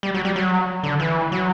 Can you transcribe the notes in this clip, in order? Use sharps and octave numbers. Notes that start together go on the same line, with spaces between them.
G3
F#3
G3
F#3
D3
E3
F#3